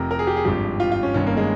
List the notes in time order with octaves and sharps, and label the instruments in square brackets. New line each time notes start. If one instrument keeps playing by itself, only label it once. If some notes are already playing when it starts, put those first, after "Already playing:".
Already playing: [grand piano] F1 F2 C3 A#4
A#4
G#4
G4
G#4
G#1 G2 F3 G4
F4
F4
C#4
G1 G2 D#3 C#4
A#3
G#3